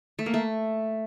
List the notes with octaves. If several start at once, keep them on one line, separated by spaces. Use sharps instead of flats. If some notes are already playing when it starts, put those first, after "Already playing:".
A3
A#3
A3